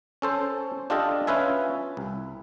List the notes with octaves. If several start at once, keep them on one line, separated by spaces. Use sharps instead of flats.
C#4 A4 C5
D4 F4 G4 A4 D#5
C#4 F4 B4 E5 G#5
C2